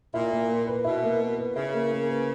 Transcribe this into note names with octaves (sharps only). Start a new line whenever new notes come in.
A#2 E4
A#3
A#3
B4
B2 E4
A#3
A#3
B4
C#3 E4
A#3
A#3
B4